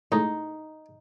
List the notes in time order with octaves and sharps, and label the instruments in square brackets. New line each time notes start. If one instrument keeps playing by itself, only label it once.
[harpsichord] A2 G#3 A3 [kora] D#4